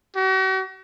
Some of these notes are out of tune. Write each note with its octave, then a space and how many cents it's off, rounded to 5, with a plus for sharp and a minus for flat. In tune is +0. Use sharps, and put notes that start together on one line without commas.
F#4 +45